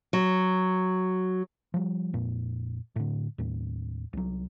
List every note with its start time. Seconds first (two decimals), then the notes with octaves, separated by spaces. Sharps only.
0.13 F#3
1.74 F3 G3
2.13 F2 A#2
2.96 A2 D3
3.38 D#2 A2
4.13 C2 F#3